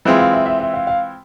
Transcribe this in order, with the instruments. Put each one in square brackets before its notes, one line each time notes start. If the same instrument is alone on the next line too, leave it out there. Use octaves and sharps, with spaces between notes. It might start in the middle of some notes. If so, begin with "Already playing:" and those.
[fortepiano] E3 G#3 C4 F4 [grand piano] E5
[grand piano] F5
E5
E5
E5
F5
F5